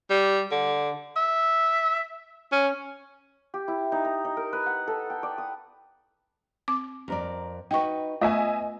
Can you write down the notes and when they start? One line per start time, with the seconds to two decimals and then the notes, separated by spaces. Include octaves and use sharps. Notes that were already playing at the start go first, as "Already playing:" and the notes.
0.10 G3
0.51 D3
1.16 E5
2.52 C#4
3.54 G4
3.68 E4
3.92 D#4
4.05 A#5
4.25 D#4
4.37 A#4
4.53 B4
4.66 F#5
4.87 A4
5.10 G5
5.23 D5
5.38 D#6
6.68 C4 D6
7.08 F2 A#4 D5
7.71 D#4 F#4 B4 G5 C#6
8.21 A3 B3 F4 D#5 E5 G#5